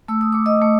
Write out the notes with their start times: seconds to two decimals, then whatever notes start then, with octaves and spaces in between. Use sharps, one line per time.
0.08 A3 E6
0.21 D#6
0.32 A3 D6
0.46 D#5 D#6
0.62 A3